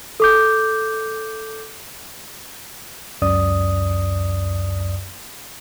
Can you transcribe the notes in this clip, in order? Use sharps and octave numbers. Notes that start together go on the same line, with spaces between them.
A4 D6 G6
C#2 F#2 D5 D#6